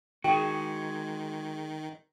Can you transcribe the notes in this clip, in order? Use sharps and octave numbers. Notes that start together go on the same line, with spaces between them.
D#3 G#3 F#4 G#4 G5